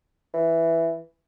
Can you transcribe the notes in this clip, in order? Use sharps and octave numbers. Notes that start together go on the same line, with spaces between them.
E3